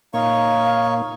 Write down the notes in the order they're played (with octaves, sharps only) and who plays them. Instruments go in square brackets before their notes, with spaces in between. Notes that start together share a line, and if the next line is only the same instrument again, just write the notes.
[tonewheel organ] A#2 A#3 [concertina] D#4 C#5 C#6 [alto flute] F5